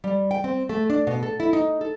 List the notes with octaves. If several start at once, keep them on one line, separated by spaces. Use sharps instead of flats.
G3
G5
C4
A3
D4
B2
A4
E4
D#4
A4